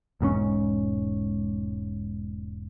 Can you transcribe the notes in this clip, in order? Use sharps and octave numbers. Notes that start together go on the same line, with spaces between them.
E1 G#2 A#3 C#4